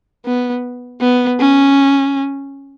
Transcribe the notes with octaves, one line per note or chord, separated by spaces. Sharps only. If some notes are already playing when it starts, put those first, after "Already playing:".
B3
B3
C#4